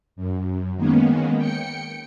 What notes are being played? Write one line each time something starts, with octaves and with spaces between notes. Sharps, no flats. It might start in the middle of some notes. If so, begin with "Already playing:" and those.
F#2
D#3 G#3 A#3 B3 C#4
G5 C#7